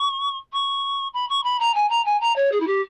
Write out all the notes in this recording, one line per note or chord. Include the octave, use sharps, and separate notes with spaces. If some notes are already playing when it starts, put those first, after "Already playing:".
Already playing: C#6
C#6
B5
C#6
B5
A#5
G#5
A#5
G#5
A#5
C#5
G#4
E4
G4